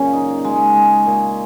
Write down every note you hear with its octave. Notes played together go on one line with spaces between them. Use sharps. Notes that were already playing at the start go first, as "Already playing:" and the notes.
Already playing: F#2 A#2 C#3 C#4
D#4
G#3
G#3
A#2